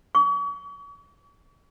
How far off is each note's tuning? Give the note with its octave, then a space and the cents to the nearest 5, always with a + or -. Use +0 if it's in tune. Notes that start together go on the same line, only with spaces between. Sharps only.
C#6 +40